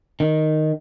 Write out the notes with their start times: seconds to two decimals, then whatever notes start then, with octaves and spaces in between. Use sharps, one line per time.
0.20 D#3